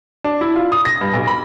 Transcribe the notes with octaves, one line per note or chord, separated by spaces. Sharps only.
D4
E4
F4
D#6
A#6
G2
B1
B5